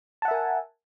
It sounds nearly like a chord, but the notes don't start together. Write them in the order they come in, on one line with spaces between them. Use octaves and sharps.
A5 F#5 E5 A#4 G#5